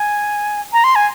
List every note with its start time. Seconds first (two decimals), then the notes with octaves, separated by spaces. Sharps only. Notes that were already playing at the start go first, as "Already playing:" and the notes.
Already playing: G#5
0.73 A#5
0.84 C6
0.95 G#5